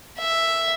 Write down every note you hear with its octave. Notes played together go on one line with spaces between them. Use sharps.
E5